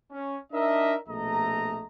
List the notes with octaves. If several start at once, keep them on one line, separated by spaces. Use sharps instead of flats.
C#4
D4 D#4 A#4 D#5 E5
A#1 B2 A3 D#5 A#5